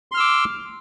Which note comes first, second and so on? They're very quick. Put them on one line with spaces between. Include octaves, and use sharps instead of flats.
C6 F6 E6 D6